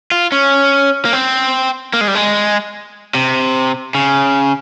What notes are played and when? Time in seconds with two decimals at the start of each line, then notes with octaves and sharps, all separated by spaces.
0.12 F4
0.32 C#4
1.05 A#3
1.13 C4
1.94 A#3
2.01 G#3
2.08 G3
2.15 G#3
3.15 C3
3.95 C#3